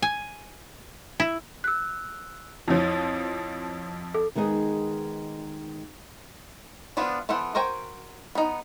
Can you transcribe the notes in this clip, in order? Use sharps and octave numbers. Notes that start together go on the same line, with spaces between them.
G#5
E4
E6 F#6
F2 F3 E4 C#5
A4
D#3 G#3 B3 D#4 G#4
E3 F3 B3 D4 F4
E3 B3 A4 C5 F#5
F#4 A#4 C5 G5 G#5
B3 D#4